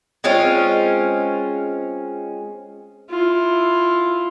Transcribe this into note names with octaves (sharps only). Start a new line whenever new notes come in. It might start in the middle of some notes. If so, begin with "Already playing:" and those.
G#3 C4 C#4 F4
E4 F4